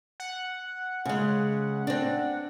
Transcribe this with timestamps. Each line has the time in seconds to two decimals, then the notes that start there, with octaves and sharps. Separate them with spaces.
0.20 F#5
1.05 C#3 G#3
1.87 C4 D4